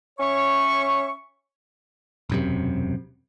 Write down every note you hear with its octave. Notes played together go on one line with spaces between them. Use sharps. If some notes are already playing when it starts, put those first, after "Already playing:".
C#4 C#5 E5 C#6
E1 F#2 C3